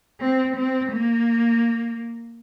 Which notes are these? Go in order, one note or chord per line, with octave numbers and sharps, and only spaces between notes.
C4
C4
A#3